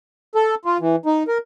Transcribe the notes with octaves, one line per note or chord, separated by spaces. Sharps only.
A4
F4
E3
D#4
A#4